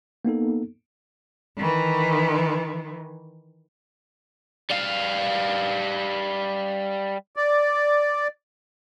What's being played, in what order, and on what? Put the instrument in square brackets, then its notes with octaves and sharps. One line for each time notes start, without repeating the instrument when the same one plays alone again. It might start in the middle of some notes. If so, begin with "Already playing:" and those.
[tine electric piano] A#3 B3 D#4 A4
[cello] D#3 E3
[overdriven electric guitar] G3 F5
[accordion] D5